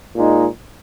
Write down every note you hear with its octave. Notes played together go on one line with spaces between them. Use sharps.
A#2 G#3 D#4